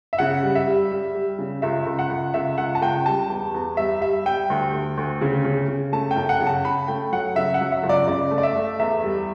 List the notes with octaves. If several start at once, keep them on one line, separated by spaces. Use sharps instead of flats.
E5
C#3 F#5
G3
E5
G3
G3
G3
C#3
C#2 E5
C#2
F#5
C#2
C#2 E5
C#2 F#5
A5
C#2 G5
G3 A5
E2
E2
G3 E5
G3 E5
G3 G5
D2
D2
D2
C#3
C#3
C#3
A3 A5
G5
F#2
F#5
C#3
A5
C#3 B5
A3 G5
F#3 F#5
C#3 E5
F#5
F#3
E5
C#2
D5
C#3 D5
A3
D5
E5
A3
E2 E5
G3